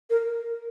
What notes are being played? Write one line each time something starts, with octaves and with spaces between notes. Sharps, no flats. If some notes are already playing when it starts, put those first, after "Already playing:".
A#4